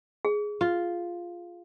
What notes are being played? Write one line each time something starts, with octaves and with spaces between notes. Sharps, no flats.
G#4
F4